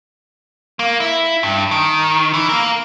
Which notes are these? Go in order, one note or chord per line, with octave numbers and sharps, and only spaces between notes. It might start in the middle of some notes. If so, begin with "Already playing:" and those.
A#3
E4
G2
D#3
E3
A#3 A#4